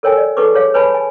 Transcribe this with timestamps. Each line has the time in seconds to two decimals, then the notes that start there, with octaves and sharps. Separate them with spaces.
0.03 A4 A#4 C#5 G5 G#5
0.17 D5
0.37 D#4 G#4 A4 B4 C#6 D6
0.54 G#4 C#5 F5
0.74 B4 C#5 G#5 A5 B5
0.94 G#5